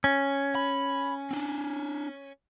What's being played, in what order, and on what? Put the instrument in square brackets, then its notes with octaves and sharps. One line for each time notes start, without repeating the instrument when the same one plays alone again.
[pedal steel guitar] C#4
[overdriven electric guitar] B5
C4 D4